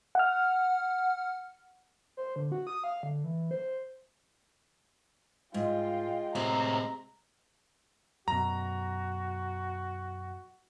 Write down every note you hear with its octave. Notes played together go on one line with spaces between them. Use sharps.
F#5 F6
C5
D3
F#4
D#6
F5
D3
E3
C5
G#2 G#3 F4 G5
A2 C3 C4 A#5
F#2 B2 F#4 A#5